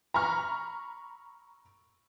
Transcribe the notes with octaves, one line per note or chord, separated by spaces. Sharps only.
A#5 B5 C#6 F6